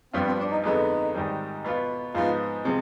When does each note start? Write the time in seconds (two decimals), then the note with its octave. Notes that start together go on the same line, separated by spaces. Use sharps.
0.13 G2 F3 B3 C4 D4 F4
0.26 C4
0.38 D4
0.51 D#4
0.64 F2 D3 G#3 B3 D#4
1.15 G#2 D#3 G3
1.64 B2 B3 F4
2.14 G#2 F3 B3 D#4 F4
2.65 C3 F3 G#3